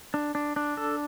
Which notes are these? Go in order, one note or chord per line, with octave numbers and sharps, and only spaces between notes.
D4
D4
D4
A4